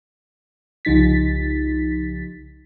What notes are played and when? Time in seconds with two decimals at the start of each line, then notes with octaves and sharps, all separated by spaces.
0.85 C2 C#3 F3 D#4 A6 B6